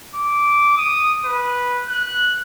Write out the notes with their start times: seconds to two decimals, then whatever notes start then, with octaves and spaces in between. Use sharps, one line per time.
0.15 D6
0.77 D#6
1.25 B4
1.88 F#6